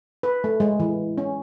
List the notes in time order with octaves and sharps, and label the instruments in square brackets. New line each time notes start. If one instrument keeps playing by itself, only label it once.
[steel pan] B4
A3
G#3
E3
C#4